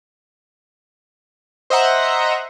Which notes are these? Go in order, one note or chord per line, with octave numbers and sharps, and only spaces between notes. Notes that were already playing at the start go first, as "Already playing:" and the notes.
C5 D#5 E5 F#5 A#5